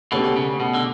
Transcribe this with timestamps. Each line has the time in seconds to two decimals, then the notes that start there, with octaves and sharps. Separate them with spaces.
0.12 B2 D3 A3 C#4 G4
0.36 C#3
0.60 B2
0.74 D3